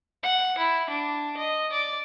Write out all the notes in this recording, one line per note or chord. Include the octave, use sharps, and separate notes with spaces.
F#5
E4
D4
D#5
D5